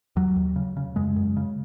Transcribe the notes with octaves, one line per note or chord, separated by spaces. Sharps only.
D#2 F#3
D#2
C#3
C#3
F#2 G#3
F#2
C#3